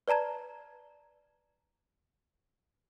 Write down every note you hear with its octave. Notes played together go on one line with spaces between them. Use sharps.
B4 D5 A5 A#5 G#6